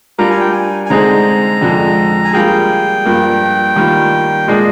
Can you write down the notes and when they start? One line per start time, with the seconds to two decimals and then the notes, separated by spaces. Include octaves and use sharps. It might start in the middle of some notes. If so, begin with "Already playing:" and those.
0.19 G3 D4 F4 A#4 A#5
0.30 G#5
0.41 G5
0.53 G#5
0.86 G#5
0.90 D3 G#3 C4 D#4 G#4 A#5
1.62 F2 D3 F3 G#3
2.25 G#5
2.33 G3 A#3 F4 G#4 G5
3.06 G2 F3 A#3
3.76 D#3 G3 A#3 F4
4.48 A#2 G#3 D4 G#4 D#5